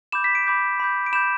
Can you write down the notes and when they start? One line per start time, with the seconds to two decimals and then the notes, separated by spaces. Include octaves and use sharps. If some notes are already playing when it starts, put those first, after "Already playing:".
0.12 B5 D6 G6 E7
0.24 B6
0.35 D7
0.47 B5 D6 G6
0.80 B5 D6 G6
1.06 D7
1.13 B5 D6 G6 E7